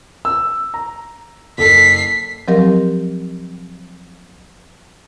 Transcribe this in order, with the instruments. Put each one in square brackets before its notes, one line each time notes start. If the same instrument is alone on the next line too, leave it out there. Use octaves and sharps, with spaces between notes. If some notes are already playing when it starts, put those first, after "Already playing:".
[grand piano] E6
A#5
[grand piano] F#1 A4 [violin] B6 C7
[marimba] F3 F#3 C4 G4 A#4 D#5